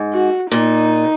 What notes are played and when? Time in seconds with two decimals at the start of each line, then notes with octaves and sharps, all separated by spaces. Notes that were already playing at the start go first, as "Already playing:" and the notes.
Already playing: G#2
0.13 F#4
0.51 A#2 D#4